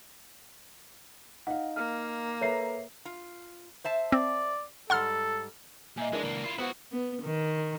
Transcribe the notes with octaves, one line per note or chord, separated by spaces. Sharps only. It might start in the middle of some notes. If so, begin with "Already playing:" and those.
D#4 F5 F#5
A#3 F6
A4 B4 C#5 E5 A#5 C7
F4
C5 E5 A5
C4 D5
G#2 G3 A4 F#5 C6 F6
A#2 D#5 E5 G#5
E3 G#3 D4 A#4
C#2 A#3
E4 F4
B3 E4 F#4 C5 F#5
B3
D#3